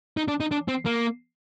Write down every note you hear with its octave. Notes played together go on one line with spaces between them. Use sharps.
D#4
D4
D#4
D4
C4
A#3